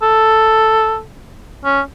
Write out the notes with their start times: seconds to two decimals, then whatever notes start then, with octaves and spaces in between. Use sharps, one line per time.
0.02 A4
1.65 C#4